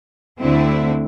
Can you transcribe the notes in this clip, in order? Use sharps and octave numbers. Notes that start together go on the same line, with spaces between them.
D2 D3 A3 C4 E4